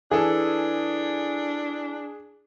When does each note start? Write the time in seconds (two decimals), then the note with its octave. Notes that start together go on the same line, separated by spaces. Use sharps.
0.11 E3 D4 G#4 A4